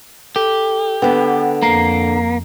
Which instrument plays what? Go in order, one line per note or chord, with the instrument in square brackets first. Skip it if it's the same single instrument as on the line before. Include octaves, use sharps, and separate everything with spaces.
[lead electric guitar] G4 [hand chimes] A4
[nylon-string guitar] D3 B3 [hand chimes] B4 F#5 G5
[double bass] F2 [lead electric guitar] A#3 [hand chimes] A#5 C7